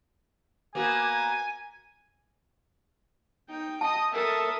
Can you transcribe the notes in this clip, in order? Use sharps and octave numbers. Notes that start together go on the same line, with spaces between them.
A#3 B3 F#4 G#5
D#4 G5
D#5 A5 D#6
A4 A#4 E5 D#6